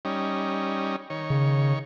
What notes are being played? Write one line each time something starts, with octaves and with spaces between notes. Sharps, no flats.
G3 C#4 D#4
D#3 C#5
C#3